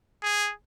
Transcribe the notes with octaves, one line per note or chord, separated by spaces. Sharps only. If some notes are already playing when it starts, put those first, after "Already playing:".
G#4